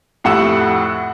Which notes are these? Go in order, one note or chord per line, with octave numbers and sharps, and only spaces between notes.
F2 A2 G4 F#5 E6 E7